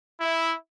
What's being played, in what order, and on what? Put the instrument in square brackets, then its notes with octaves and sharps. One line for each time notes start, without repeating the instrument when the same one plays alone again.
[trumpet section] E4